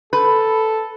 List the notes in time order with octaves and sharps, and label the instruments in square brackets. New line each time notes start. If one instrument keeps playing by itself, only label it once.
[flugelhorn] A4 [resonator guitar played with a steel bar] B4